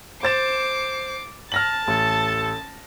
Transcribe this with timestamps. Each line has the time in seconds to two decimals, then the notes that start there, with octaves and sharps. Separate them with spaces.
0.23 C5 D6 A6 C7 E7
1.52 A5 F6 A6 A#6 F#7
1.87 A1 A4